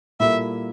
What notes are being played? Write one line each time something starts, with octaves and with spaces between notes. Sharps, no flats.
A#2 G3 A#3 E4 A4 E5